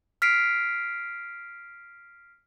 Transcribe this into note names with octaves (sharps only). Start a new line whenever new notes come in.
F6 B6 C7 D7